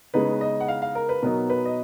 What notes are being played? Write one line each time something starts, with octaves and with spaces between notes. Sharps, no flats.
C#3 G#3 B3 D#4 B4
D#5
F#5
F5
F5
A#4
B4
B2 F#3 B3 D#4 A#4
B4
D#5